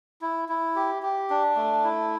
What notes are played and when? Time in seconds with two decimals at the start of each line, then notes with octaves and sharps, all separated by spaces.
0.22 E4
0.49 E4
0.75 G4
1.03 G4
1.30 D4
1.56 A3
1.84 E4